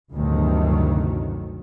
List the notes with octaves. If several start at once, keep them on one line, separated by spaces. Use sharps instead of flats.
G1 D2 A2 C3 D#3 F#3